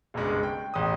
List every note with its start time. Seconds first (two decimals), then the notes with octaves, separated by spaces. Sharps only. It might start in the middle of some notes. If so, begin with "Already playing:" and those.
0.14 F#1 B1 G2 G#3 C#6
0.43 G5
0.74 E1 A1 D#6